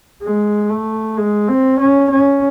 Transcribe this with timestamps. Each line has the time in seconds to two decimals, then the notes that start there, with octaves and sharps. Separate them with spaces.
0.22 G#3
0.71 A3
1.17 G#3
1.48 C4
1.79 C#4
2.11 C#4